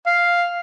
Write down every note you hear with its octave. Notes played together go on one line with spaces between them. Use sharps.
F5